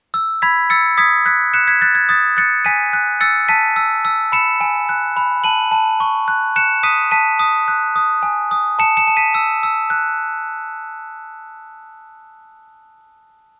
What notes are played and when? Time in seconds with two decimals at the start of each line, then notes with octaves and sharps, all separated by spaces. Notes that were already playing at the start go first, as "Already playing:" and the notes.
0.14 E6
0.42 B5 G#6 B6
0.70 E6 A6 C#7
0.98 D#6 G#6 B6
1.25 F#6 G#6 B6
1.54 F#6 C#7 E7
1.67 G#6 B6
1.81 F#6 A6
1.95 G#6
2.09 D#6 A6
2.37 F#6 A6 C#7
2.65 G#5 B6 D#7
2.93 F#6
3.20 E6 A6 C#7
3.48 A5 B6 D#7
3.76 E6
4.05 E6
4.32 B5 C#7 E7
4.60 G#5
4.89 F#6
5.17 B5
5.44 A5 D#7 F#7
5.72 A5
6.00 C#6
6.28 F#6
6.56 F#6 C#7 E7
6.83 D#6 B6 D#7
7.11 A5 B6 D#7
7.39 D#6
7.68 F#6
7.96 D#6
8.23 G#5
8.51 D#6
8.79 A5 C#7 E7
8.97 C#7 E7
9.07 A5
9.17 B6 D#7
9.34 E6
9.63 E6
9.90 F#6